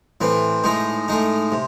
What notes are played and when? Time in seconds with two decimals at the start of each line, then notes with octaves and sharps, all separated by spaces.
0.21 A2 E3 C4
0.64 A2 G#3 D#4
1.08 A2 G#3 D#4
1.52 C3